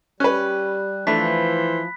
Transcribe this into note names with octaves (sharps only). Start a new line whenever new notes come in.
G3 C#4 B4 F#6
E3 F3 A3 D4 C5 B5 B6